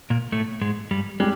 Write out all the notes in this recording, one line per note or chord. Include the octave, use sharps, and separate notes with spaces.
A#2 A#3
A2 A3
G#2 G#3
G2 G3
G3 G#3